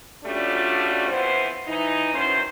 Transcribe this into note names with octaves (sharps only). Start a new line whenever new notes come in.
G3 A3 C#4 D4 F4 F#4
F2 E3 B3 C5
E3 D#4
D#3 E3 F#3 C#4 C5